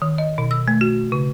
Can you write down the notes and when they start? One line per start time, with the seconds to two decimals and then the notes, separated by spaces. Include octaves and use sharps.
0.02 D#3
0.18 D#5
0.38 B2
0.51 E6
0.68 A3
0.81 F#4
1.12 C#3